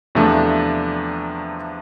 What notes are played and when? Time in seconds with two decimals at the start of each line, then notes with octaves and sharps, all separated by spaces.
0.15 E2 C3 F3 A3 D4